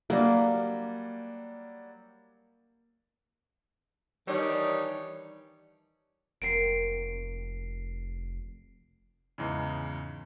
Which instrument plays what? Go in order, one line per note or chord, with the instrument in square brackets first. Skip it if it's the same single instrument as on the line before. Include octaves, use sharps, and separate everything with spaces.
[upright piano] F#3 G3 D4 [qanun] A#3
[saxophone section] D#3 E3 G3 D4 D#4 C#5
[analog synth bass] F1 [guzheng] F#3 A#3 C4 [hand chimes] C7 D7
[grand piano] E2 G#2 C#3